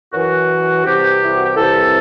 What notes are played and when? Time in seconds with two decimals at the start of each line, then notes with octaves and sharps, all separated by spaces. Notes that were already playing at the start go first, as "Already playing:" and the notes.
0.12 F#2 E3 F#4
0.84 C2 C3 E3 G4
1.24 E4
1.35 F#4
1.46 G4
1.57 C2 C3 E3 A4